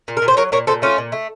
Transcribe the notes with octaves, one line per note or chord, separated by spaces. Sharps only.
A#2
A#4
A#2
C5
F#3 A#4 C#5
A#2 A#4 C#5
A#2 A4 C5
A3 C#4 F4
A#2
A3